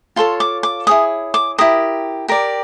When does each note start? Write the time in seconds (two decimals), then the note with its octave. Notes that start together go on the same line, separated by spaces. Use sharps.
0.16 F4 A4 C#5 C6
0.40 D6
0.63 D6
0.87 E4 G#4 C#5 D#6
1.34 D6
1.58 E4 G4 A#4 D#6
2.28 G4 A#4 D5